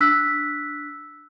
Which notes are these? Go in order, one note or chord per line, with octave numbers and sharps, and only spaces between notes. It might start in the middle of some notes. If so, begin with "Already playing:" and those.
D4 E6 F#6 B6